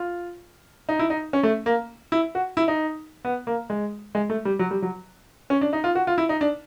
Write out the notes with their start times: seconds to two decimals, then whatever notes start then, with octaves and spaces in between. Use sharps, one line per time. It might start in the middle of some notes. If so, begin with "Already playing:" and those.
Already playing: F4
0.89 D#4
0.99 E4
1.10 D#4
1.33 C#4
1.43 A3
1.66 A#3
2.12 E4
2.35 F#4
2.57 E4
2.68 D#4
3.25 B3
3.47 A#3
3.70 G#3
4.15 G#3
4.30 A3
4.45 G3
4.59 F#3
4.71 G3
4.82 F#3
5.50 C#4
5.61 D4
5.73 D#4
5.84 F4
5.95 F#4
6.07 F4
6.18 E4
6.29 D#4
6.41 D4